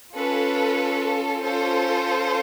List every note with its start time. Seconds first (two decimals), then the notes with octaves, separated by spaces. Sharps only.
0.14 C#4 F4 A4 B4
1.42 C#4 F4 A4 C5